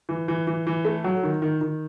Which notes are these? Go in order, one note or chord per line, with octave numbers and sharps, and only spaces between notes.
E3
E3
E3
E3
A3
F#3
D#3
D#3
D#3